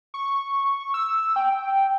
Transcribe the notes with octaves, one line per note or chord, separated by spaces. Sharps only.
C#6
E6
G5